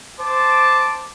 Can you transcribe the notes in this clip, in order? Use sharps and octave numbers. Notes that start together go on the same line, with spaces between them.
C5 A5 D6